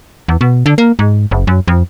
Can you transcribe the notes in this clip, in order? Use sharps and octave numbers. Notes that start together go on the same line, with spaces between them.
E2
B2
D3
A#3
G#2
F#1
F#2
F2